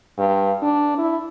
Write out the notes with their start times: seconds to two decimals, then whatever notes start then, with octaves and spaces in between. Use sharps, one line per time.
0.18 G2
0.62 D4
0.98 E4